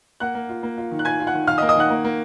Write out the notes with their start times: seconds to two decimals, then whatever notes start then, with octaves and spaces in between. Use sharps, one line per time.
0.20 A#3 F#5 F#6
0.35 A#3
0.49 F4
0.63 A#3
0.78 F4
0.91 D#3
0.99 F#6
1.05 F4 G#5 G#6
1.20 F4
1.27 F#5 F#6
1.33 D#3
1.47 D#3 F5 F6
1.58 D#5 D#6
1.62 A#3
1.69 D#5 D#6
1.76 D#3 F#5 F#6
1.90 A#3
2.05 A#3